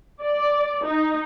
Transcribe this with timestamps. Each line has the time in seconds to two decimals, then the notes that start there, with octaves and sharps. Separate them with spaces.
0.22 D5
0.86 D#4